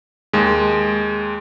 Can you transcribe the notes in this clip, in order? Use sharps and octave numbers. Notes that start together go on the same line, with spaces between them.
D#2 G#3